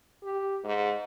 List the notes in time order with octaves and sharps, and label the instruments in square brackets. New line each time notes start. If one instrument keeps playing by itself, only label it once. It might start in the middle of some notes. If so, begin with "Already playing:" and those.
[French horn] G4
G#2